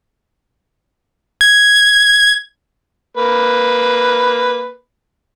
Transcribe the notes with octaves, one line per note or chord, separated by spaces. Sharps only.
G#6
A#3 B4